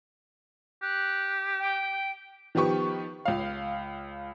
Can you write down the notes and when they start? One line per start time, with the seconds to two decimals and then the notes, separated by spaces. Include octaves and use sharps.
0.82 G4 F#6
1.60 G5
2.55 D#3 F3 B3 G4 C#6
3.25 C#2 F5